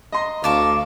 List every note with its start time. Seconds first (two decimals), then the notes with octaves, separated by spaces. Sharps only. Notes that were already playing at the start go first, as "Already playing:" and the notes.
0.12 D#5 A#5 C6
0.44 D2 D5 F5 A5 C#6